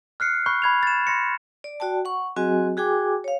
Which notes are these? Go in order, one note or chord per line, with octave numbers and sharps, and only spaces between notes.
F6 F#6 C7 C#7
B5 C#6 F#6 G6 C7
B5 G#6 F7
A6 E7
C6 A#6 C#7
D5
F#4 D5 G5 A5
F#5 C#6
F#3 C4 F#4 G#4 D#5 G#5
F#4 G#4 G5 G#5 D6
C#5 F5